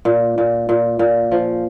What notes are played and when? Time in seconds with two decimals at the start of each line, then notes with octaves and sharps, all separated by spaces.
0.05 A#2
0.38 A#2
0.69 A#2
0.99 A#2
1.32 F3